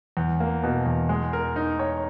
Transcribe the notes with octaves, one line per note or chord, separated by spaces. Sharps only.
E2
A#3
B2
E2
G#3
A#4
D#4
C#5